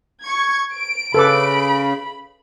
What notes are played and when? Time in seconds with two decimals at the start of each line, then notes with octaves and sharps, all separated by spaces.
0.22 C#6 G#6
0.73 D7
1.14 C#3 A4 B4 B5 D6